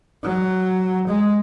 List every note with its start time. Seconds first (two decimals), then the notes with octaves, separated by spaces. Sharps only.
0.24 F#3
1.07 G#3